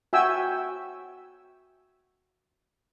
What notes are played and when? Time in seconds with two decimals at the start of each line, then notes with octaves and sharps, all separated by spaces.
0.13 F#4 E5 G5 G#5 E6